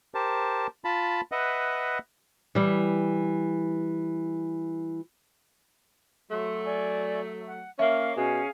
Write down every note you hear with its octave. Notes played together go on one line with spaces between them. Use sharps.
G4 A#4 C5 A5
F4 A5 B5
B4 D#5 E5 F#5
E3 G3
F#3 A3 C6
D5 G#5
F#5
A#3 C#4 E5 F5 F6
B2 C#4 G#4 F5